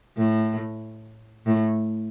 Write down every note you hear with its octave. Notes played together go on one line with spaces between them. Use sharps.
A2
A2